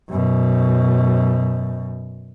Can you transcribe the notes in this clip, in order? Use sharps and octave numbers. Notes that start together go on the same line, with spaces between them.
F#2 B2